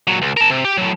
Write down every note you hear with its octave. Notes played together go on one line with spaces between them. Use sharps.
A#2 F#3
C#2
A#4 A5
C3
G4
A2 F#3